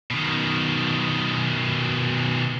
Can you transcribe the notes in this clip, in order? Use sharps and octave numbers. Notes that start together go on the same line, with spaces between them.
B2 D#3